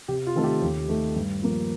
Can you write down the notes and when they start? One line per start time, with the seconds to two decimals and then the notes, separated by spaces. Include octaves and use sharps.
0.08 C3 G4
0.27 F4
0.35 D#3 A3 C4 D#4 A4
0.44 G4
0.62 D#2
0.88 D#3 A3
1.15 G2
1.42 F3 A#3